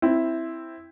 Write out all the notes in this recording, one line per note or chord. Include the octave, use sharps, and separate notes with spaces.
C4 E4